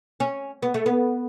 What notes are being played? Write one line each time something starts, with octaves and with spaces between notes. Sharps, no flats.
C#4
B3
A3
B3